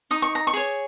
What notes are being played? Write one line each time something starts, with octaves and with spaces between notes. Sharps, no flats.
D#4 D#6
C#6
A#5
C#6
G#4 C#5